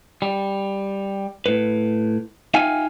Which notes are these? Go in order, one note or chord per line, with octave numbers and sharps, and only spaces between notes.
G3
A2 B4
D#4 F4 E5 F5 G5 G#5